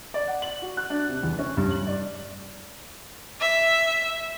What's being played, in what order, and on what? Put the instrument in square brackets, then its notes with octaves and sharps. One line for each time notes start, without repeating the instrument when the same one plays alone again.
[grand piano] D5
F#5
F#7
F#4
F#6
D4
C3
E2
C#4
G2
F#7
D5
[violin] E5